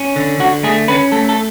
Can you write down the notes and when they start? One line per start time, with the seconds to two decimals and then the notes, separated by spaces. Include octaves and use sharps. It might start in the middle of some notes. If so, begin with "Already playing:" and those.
Already playing: C#4
0.16 D3
0.40 D3 F#4
0.63 A3 G#4
0.88 C#4 B4
1.12 A3 A4
1.29 A4